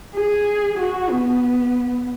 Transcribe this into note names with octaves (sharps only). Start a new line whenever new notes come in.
G#4
F#4
B3